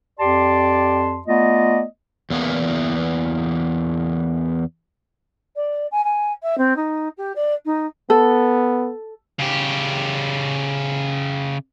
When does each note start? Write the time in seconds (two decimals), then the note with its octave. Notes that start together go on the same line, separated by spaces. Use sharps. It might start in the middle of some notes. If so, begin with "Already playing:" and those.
0.19 F2 G4 D5 A5 C6
1.27 A3 B3 F4 D5 D#5
2.30 E2 A#3 B3
5.55 D5
5.91 G#5
6.04 G#5
6.42 E5
6.57 C4
6.76 D#4
7.17 G4
7.35 D5
7.65 D#4
8.10 B3 A4
9.39 C#3 G4